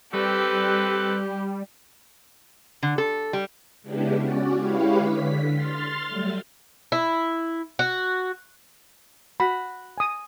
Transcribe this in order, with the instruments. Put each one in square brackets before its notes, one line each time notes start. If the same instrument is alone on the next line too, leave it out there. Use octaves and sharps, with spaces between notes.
[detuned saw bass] G3 [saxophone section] C4 A4 B4 [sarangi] G4
[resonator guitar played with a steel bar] D3
A4
G3
[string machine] C#3 G#3 B3 D4 E4 G4
C#4 F#4 D5
G#3 E4 G4 B4 C#5 F5
D3 B6
C6 F6 A6
F#3 G3 A3
[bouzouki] E4
F#4
[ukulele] F#4 [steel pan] B5
[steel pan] G#5 D#6